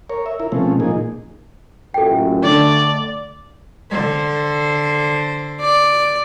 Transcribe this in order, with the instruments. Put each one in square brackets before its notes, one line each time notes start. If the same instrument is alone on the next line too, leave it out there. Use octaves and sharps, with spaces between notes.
[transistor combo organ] A#4 C#5
E5
E4 A#4
B2 F3 G#3 A3 C4 C#4
A#2 F3 A#3 D#4 G#4
[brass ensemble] A1 F#2 A#2 [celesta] A4 G5
[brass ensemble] D3 A3 [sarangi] D5
[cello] D3 C5
[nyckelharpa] D5